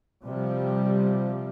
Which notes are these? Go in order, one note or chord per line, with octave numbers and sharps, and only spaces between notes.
C3 F3 G3